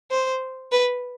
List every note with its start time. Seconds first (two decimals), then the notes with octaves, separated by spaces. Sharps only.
0.11 C5
0.72 B4